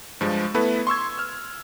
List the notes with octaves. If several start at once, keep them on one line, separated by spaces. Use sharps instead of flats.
G2 F3 G#3
A3 B3 E4 A4 B4
C6 C#6 E6 G#6
E6 F6